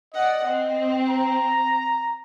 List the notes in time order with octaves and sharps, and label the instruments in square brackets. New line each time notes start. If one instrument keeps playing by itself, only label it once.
[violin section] D5 F#5 [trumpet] D#5
[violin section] C4 [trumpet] D#5
[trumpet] A#5